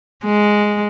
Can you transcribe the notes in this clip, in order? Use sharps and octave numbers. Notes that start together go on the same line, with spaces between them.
G#3